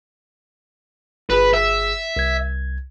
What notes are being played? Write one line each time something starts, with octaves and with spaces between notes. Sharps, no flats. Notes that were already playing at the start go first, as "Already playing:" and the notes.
G1 G#4 B4
E5
C2 G#6